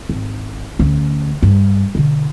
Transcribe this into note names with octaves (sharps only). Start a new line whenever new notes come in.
G#1
D2 C#4
G2
B2 D3